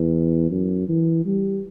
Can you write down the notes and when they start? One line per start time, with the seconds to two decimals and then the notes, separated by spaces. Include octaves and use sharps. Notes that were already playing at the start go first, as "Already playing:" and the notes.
Already playing: E2
0.51 F#2
0.89 E3
1.25 G3